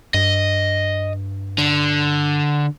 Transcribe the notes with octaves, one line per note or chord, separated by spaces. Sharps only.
G2 D#5
D3